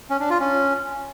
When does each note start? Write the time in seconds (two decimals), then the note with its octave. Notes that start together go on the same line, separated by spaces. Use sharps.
0.10 C#4
0.20 D4
0.30 F4
0.40 C#4